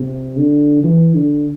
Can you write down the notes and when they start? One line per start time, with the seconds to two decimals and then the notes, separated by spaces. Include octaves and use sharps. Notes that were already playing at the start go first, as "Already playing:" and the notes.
Already playing: C3
0.38 D3
0.84 E3
1.14 D3